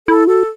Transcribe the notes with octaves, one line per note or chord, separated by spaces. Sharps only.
E4 A4
F#4 A4